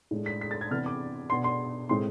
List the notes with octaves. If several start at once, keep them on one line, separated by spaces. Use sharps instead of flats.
A2 G#3 D4
B6
B6
A6
G#6
C3 E3 B3 D4 F6
D6
B2 B3 D4 C6
C6
A2 G#3 C4 C6